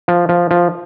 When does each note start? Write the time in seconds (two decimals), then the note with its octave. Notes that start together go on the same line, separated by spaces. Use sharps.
0.08 F3
0.29 F3
0.51 F3